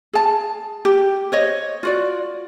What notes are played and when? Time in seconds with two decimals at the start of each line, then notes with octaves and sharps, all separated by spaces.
0.13 G#4 A5
0.85 G4
1.32 C5 C#5 D#5
1.83 F4 F#4 D5